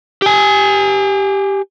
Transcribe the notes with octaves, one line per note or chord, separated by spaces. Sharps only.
G4 G#5